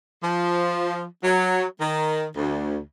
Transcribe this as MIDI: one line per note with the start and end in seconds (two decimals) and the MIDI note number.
0.24 1.05 53
1.24 1.65 54
1.80 2.27 51
2.36 2.80 38